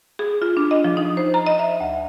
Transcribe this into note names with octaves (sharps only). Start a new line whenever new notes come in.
G#4
F4
D4
D#5
F3
D#4
C5
A#5
D#5
E5
D2